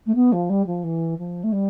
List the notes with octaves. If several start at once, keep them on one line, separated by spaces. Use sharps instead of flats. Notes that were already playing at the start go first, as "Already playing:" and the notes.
A3
B3
F3
G3
F3
E3
F3
A3
G3